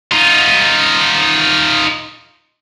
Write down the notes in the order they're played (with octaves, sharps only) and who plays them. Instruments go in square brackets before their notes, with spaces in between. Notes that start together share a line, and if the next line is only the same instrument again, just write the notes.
[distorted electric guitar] D#4 F4